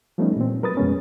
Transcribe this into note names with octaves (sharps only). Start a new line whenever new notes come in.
F3 G3 A3 B3 C#4 D#4
A#2 E3 C4
F#3 A#4 B4 D#6 A6
F2 B2 G#3 B3 C#4